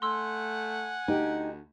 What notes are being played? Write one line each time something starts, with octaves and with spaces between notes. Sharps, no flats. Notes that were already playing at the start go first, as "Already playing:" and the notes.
A3 F#5 G#5 C6 E6
D2 D#4 G4